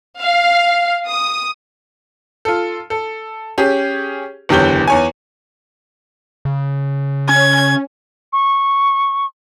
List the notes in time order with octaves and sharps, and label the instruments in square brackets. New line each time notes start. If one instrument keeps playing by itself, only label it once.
[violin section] F5
D#6
[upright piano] F4 A4
A4
C#4 G4 G#4
F#1 E2 D3 G4 C#5 G7
E2 C#5 G#5
[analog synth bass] C#3
[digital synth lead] C#4 [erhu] G#6
[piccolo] C#6